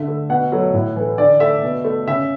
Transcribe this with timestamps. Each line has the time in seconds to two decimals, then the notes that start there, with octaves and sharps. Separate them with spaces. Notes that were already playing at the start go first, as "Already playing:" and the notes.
Already playing: D3 E5
0.08 A3
0.29 B2 F#5
0.52 F#3 A3
0.73 A2
0.96 E3 A3
1.18 D3 D5
1.40 A3 E5
1.63 B2
1.85 A3
2.07 C#3 E5